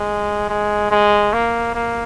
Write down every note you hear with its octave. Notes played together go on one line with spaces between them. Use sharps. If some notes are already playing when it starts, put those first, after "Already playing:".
Already playing: G#3
G#3
G#3
A#3
A#3